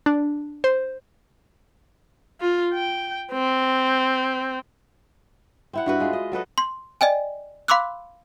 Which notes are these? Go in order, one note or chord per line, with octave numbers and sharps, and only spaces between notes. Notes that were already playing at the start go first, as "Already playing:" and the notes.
D4
C5
F4
G5
C4
C4 E4 F#5
G2 F#4 B4
G#3 F4
D#5
F#3 A4 B4 D#5
C6
D5 D#5 G5 G#5
F5 B5 C6 D6 E6 F#6